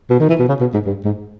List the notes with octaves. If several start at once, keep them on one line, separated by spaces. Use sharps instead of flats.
B2
D#3
E3
B2
C#3
B2
G#2
G2
G#2